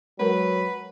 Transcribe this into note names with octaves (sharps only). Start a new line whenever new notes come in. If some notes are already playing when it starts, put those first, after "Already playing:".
F#3 G#3 A#4 B4